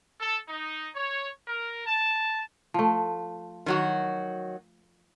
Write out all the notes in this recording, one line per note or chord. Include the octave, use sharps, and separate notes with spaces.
A4
D#4
C#5
A#4
A5
F3 A3
D#3 F#3 F#4